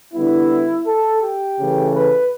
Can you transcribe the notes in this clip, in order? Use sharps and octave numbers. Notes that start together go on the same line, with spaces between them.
D3 G3 B3 E4
A4
G4
C#3 E3 A3
B4